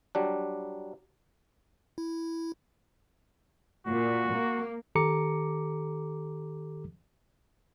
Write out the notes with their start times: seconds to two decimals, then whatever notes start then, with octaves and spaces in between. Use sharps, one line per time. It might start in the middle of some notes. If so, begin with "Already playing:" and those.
0.15 F#3 G3 D4
1.98 E4
3.87 A#2 F#4
4.34 A#3
4.95 D#3 G4 A4 A#5 D6 C#7